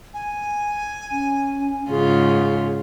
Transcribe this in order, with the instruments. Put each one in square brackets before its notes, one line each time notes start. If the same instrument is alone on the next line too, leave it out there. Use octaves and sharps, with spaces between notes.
[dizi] G#5
[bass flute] C#4
[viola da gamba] G#2 C#3 F4 [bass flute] G#4